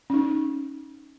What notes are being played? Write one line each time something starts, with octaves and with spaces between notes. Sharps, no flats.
C#4
D#4